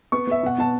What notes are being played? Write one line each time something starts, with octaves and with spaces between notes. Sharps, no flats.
B3 C#6
B3 E5
B2 F#5
B2 A5